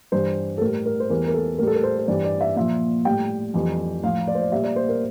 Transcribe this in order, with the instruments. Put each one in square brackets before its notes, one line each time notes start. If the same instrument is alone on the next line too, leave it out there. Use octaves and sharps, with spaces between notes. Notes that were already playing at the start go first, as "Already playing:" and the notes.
[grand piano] G2 E3 G3 C5
A4
A2 G3 A#4
A#4
C5
E2 E3 G3 A#4
A#4
A4
A2 G3 A#4
A4
A#4
C5
C5
G2 E3 G3 D5
D5
E5
A#2 F3 E5
A2 G3 G5
F2 E3 G3
A2 F3 F5
D5
C5
D5
A#2 G3 E5
D5
C5
A#4